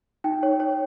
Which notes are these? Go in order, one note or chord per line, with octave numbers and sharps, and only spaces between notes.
D#4 G5
C#5
C#5